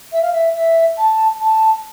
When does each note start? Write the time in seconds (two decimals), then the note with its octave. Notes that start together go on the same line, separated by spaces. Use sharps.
0.12 E5
0.22 F5
0.33 E5
0.54 E5
0.98 A5
1.40 A5